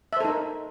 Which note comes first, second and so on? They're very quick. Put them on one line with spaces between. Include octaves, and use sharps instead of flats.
E5 C5 A4 D#4 A#4